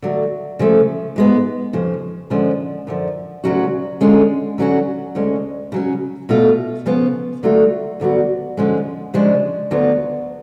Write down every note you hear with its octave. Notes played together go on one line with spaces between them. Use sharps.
D3 F#3 A3
C#3 F3 A3
G#2 G#3 B3
F2 C#3 F3
F#2 D3 F3 G#3 C#4
F#2 D3 F3
D2 C#3 F#3 C#4 F#4
D3 G#3 C#4 F4
D3 F#3 C#4 F#4
D2 C#3 G#3 C#4
C#3 F#3 C#4
B2 A3 F4
C#3 F3 B3 F4
D3 F#3 A3 F4
D2 D3 F#3 B3 F#4
F2 D3 F3 G#3 C#4
C#3 F3 G#3 D4
D2 D3 F#3 B3 F4